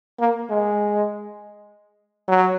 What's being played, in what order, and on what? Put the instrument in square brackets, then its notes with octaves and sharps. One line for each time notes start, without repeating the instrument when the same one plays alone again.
[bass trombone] A#3
G#3
F#3